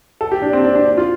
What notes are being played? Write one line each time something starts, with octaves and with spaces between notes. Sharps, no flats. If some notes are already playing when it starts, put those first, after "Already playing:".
A4
G4
D4
C4
D4
D4
F4